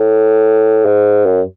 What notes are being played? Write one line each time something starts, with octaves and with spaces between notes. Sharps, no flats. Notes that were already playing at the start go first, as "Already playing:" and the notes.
Already playing: A2
G#2
F#2